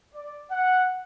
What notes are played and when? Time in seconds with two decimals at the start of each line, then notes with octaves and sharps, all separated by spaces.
0.14 D5
0.51 F#5